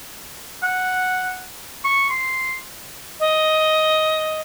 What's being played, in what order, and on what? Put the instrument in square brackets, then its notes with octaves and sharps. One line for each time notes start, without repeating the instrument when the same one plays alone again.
[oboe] F#5
C#6
C6
[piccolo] D#5